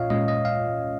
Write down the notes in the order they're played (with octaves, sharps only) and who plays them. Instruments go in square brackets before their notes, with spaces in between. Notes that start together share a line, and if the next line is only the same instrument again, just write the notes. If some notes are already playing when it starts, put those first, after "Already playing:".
Already playing: [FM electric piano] A#2 C#4 F4 [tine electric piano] C#5 D#5 F5
[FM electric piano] A#2 G#3 C#4 F4 [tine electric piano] D#5
[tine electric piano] D#5
F5